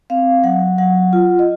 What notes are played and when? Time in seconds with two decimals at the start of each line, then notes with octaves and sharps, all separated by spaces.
0.10 C4 F5
0.44 F#3 F#5
0.78 F#3 F#5
1.13 F4
1.39 D#5